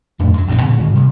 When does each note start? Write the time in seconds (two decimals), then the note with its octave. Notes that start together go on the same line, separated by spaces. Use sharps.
0.19 F2 A2 D4
0.34 F#2 F#3
0.47 A#1 G#2 F3 C4
0.61 D2 A#2 D3
0.79 D2 G#2 D#3
0.92 C3 G3